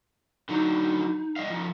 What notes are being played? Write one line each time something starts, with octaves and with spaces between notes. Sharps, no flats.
D3 F#3 D#4
G3 D#5 F5
F3 D#4